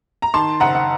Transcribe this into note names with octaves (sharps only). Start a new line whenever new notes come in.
A#5
D#3 A5 C6
F#1 F#5 A#5
F#5